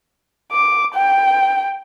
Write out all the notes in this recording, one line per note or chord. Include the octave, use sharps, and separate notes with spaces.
D6
G5